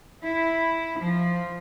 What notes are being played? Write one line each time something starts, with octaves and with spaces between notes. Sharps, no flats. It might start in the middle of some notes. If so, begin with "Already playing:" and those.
E4
F3